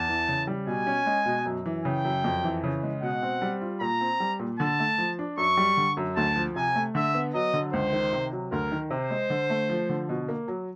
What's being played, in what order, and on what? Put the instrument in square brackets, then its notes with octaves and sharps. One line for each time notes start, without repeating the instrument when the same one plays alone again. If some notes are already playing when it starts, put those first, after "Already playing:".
Already playing: [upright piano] E2 [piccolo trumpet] A5
[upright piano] E3
C#3
G3
[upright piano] B2 [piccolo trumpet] G#5
[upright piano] C#4
G#3
B2
F#2
E3
[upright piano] C#3 [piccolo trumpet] G5
[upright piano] F#2
F2
E3
C#3
G#3
[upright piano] B2 [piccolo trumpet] F#5
[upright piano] C4
G3
F4
[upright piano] A#2 [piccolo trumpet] A#5
[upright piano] C4
G3
A#2
[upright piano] D3 [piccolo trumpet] A5
[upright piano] A3
F3
D4
[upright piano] F#2 [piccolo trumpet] C#6
[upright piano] G3
D3
F#2
[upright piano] D2 [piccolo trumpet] A5
[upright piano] F3
[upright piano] C3 [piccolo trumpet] G#5
[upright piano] A3
[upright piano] D3 [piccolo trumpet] E5
[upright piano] B3
[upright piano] F#3 [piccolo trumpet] D#5
[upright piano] D3
[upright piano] C#2 [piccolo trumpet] C5
[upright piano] D#3
C3
F#3
[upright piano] D2 [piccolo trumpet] A#4
[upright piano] D#3
[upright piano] C3 [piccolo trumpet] C5
[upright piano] G#3
D3
A3
F3
D3
B2
A#3
F#3